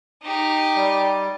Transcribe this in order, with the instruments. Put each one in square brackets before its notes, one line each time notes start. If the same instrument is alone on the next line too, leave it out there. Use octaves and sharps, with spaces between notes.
[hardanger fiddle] D#4 G4
[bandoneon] G3